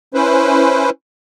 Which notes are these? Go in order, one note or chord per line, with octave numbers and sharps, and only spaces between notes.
C#4 E4 B4 C5